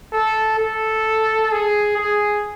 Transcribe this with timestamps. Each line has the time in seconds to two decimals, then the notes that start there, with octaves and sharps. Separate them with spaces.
0.13 A4
0.59 A4
1.52 G#4
1.97 G#4